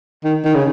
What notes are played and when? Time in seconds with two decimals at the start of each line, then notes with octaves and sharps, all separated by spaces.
0.24 D#3
0.44 D#3
0.55 C#3